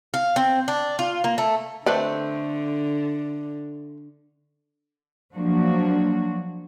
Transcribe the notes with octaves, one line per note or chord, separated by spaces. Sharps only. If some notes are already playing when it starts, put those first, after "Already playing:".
F5
C4
D4
F4
A#3
A3
D3 A3 C4 B4 D5
F3 F#3 A#3 D4 F#4